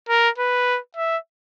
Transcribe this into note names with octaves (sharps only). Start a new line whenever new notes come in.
A#4
B4
E5